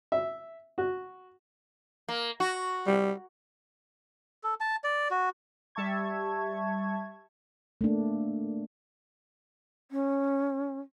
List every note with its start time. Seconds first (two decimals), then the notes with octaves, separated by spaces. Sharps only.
0.12 E5
0.78 F#4
2.08 A#3
2.40 F#4
2.87 G3
4.44 A4
4.60 A5
4.84 D5
5.11 F#4
5.75 G3 E5 A5 C#6 G#6
7.81 A3 A#3 D4
9.91 C#4